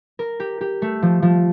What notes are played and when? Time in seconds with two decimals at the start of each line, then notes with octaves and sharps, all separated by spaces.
0.19 A#4
0.40 G4
0.61 G4
0.82 A3
1.02 F3
1.22 F3